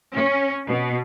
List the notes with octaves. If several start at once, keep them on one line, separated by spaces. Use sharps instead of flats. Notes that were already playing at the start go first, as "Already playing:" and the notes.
C#4
B2